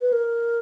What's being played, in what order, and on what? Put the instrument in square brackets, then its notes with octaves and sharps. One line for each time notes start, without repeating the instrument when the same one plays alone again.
[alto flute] B4
A#4